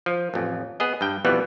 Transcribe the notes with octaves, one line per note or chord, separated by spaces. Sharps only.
F3
A1 F2
B3 G#4 D#5
G2 G5
F2 B2 E3 G3 B3